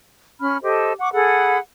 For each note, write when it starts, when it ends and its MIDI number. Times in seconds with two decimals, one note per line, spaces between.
0.40 0.57 61
0.40 0.57 83
0.40 0.57 89
0.62 0.92 67
0.62 0.92 69
0.62 0.92 72
0.62 0.92 75
0.99 1.13 78
0.99 1.13 85
0.99 1.13 86
1.13 1.58 68
1.13 1.58 69
1.13 1.58 78
1.13 1.58 83